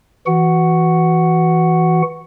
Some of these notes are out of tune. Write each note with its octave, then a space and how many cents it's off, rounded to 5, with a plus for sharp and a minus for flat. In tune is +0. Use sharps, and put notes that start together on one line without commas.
E3 +0 F#4 +0 F#5 +5